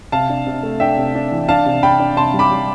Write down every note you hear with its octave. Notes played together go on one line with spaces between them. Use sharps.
C3 F5 A5
D4
C3
A3
D4 E5 G5
C3
D4
E3
D4 F5 A5
C3
C3 G5 B5
D4
C3 A5 C6
G3
B5 D6
G3